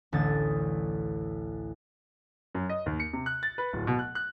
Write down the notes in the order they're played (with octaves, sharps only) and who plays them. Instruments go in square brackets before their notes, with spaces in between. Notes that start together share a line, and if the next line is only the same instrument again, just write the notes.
[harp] A1 D2 D3 D#6 A6
[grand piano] F#2
D#5
D#2
C#7
C3
F#6
A6
B4
D1
B2
F#6
F#6